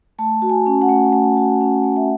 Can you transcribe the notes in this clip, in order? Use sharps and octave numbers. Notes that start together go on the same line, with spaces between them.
A3 A5
F#4
G#5
C#4
F#5
A3
A3
F#4
C#4
A3
E5